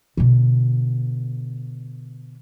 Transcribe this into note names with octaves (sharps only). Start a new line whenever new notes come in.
B2 D3